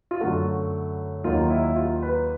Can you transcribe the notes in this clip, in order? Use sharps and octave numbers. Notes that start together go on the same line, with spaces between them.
F4
F#2 D3 F#3 A3 F#4
D#2 D#3 F#3 A#3 F4
E4
F4
B4